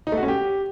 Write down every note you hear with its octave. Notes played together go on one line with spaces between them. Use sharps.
D#4
A3
F#4
C#4
G4